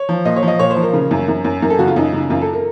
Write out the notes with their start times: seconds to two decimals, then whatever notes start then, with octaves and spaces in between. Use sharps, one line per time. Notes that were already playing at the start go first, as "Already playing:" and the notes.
Already playing: C#5
0.09 F3
0.25 A#2 D#5
0.36 C#5
0.43 F3
0.48 D#5
0.59 A#2 C#5
0.71 C5
0.76 F3
0.82 A#4
0.93 C#3
1.11 F#2
1.28 F#2
1.45 F#2
1.62 F#2 A#4
1.70 A4
1.79 C#3 F#4
1.88 F4
1.96 F#2 D#4
2.13 C#3
2.30 F#2 F4
2.42 A4
2.53 A#4